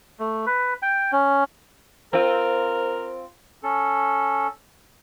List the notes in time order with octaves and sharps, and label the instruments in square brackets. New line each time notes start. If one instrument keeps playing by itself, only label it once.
[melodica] A3
B4
G5
C#4
[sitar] C4 F4 [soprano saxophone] A#4
[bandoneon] C#4 A4